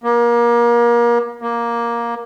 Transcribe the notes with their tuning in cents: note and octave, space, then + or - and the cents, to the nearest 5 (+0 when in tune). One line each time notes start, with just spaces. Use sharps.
A#3 +30
A#3 +10